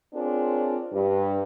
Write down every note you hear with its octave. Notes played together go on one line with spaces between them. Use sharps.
C4 D4 F4 G#4 A#4 C#5
G2